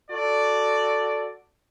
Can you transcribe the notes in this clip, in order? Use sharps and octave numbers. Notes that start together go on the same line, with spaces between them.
F#4 A4 D5